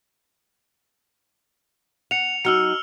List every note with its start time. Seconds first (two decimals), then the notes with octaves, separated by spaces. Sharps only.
2.11 F#5 C#7 F7
2.45 F#3 D#4 E6 F6 C#7